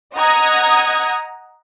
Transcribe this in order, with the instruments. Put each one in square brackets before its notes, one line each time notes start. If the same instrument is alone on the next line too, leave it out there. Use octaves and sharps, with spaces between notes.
[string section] D#5 F#5 A#5 D#6 G#6